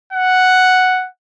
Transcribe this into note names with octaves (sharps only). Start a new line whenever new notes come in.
F#5